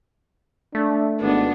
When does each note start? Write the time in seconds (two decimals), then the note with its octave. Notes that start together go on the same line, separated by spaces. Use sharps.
0.75 A3 D4
1.20 G#1 B3 D4